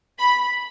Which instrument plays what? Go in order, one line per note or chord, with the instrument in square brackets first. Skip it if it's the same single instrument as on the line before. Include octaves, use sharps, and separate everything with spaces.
[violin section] B5